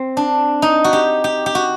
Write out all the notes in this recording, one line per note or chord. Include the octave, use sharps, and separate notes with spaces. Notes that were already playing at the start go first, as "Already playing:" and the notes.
Already playing: C4
D4
D#4
F#4
G4
G4
G4
F#4